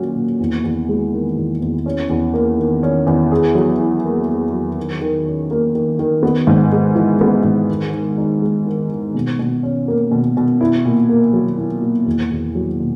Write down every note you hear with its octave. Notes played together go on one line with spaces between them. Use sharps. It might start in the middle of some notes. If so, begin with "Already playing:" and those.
Already playing: A#2 F#3 C#4 F#4
A#2
E2
E2
G#3
D#3
E2
E2
C#4
E2
A#3
D#3
C#4
E2
G#4
F#3
E4
A#3
G#4
F#3
D#3
D#3
C#4
A#3
D#3
D#3
B3
G#2
G#3
E3
B3
G#2
D#3
D#3
D#4
G#3
D#3
D#3
B2
B2
C#4
A#3
B2
B2
E4
A#2
A#3
F#3
E4
A#2
E2
E2
F#3
B2